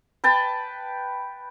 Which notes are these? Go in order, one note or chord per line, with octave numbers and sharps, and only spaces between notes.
B4 G5 A5